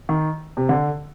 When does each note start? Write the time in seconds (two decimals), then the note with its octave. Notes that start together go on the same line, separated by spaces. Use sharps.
0.09 D#3
0.57 C3
0.69 D3